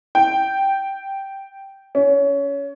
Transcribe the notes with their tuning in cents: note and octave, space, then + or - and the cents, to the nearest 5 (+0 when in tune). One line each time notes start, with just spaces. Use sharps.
G5 -5
C#4 +20